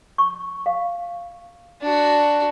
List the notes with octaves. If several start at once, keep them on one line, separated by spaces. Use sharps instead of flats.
C#6
F5
D4 F#4